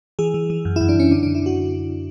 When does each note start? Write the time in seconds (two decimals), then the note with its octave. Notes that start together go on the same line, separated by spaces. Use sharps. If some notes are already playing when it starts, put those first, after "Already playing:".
0.19 E3 G#4
0.34 E3
0.50 E3
0.65 F#2
0.76 F#2 E4
0.89 D4
0.96 F#2 C#4
1.11 D3 D4
1.23 D3 D4
1.35 E4
1.42 D3 F#4